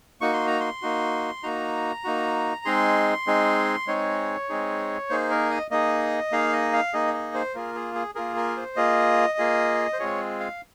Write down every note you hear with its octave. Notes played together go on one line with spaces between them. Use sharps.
A#3 D#4 F#4 C#6
C6
A#5
C6
A#3 D#4 F#4
A#3 D#4 F#4 A#5
A#3 D#4 F#4
G#3 C4 D#4 G#4 C6
G#3 C4 D#4 G#4
G#3 C4 D#4 G#4 C#5
G#3 C4 D#4 G#4
A#3 D#4 G#4 C5
A#4
D#5
A#3 D#4 G#4 D#5
A#3 D#4 G#4 F5
D#5
F5
A#3 D#4 G#4 D#5
D#5
C5
A#3 F4 G#4 A#4
G#4
G#4
A#3 F4 G#4 A#4
A#4
C5
A#3 F4 G#4 D#5
A#3 F4 G#4
C5
G#3 C4 F4 G#4 C#5
F5